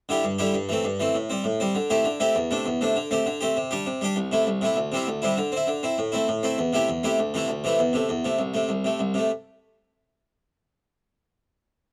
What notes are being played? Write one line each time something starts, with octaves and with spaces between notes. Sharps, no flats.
D3 G3 E4 G4
G2
D3 G3 E4 G4
G2
E3 A3 C4
G2
E3 A3 C4
A2
G3 C4
A2
G3 C4
D3
A3 C4 E4 G4
D3
A3 C4 E4 G4
E2
C3 A3 D4
E2
C3 A3 D4
D3
A3 C4 G4
D3
A3 C4 G4
C3
G3 D4 G4
C3
G3 D4 G4
C2
C3 A3 E4
C2
C3 A3 E4
D2
C3 G3 C4 E4
D2
C3 G3 C4 E4
D3
C4 E4
D3
C4 E4
A2
A3 C4 E4
A2
A3 C4 E4
E2
C3 A3 E4 G4
E2
C3 A3 E4 G4
D2
C3 E3 A3 E4
D2
C3 E3 A3 E4
E2
C3 A3
E2
C3 A3
C2
C3 A3
C2
C3 A3
C2
C3 A3